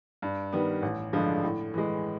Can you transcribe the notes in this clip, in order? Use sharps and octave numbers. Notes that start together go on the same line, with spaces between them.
G2
D#3 G3 B3
A1
G2 D3 F3 G#3
A2
E3 G#3